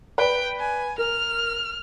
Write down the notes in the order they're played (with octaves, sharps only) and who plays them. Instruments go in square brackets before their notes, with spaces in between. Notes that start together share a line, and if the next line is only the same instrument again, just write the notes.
[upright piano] B4 D5 [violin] G5
[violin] G#5
[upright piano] A#4 [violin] F6